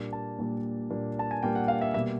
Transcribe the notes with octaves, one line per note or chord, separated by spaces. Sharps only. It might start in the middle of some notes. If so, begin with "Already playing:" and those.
Already playing: A#2 G3 A#3 D4
A5
A#2 G3 A#3 D4
A#2 G3 A#3 D4
A5
G#5
A#2 G3 A#3 D4 G5
F#5
F5
E5
B2 G3 A#3 E5